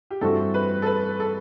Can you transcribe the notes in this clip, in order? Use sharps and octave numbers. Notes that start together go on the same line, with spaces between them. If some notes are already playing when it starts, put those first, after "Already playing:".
G4
G2 E3 A3 C4 F#4 A4
B4
A4
B4
A4